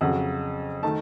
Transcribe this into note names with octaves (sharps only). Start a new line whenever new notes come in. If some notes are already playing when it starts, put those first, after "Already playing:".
F2 C#3 F#3 F#5
D#3 A3 A5